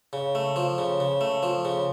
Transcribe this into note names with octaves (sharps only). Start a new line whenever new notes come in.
C#3
A3
F3
C#3
C#3
A3
F3
C#3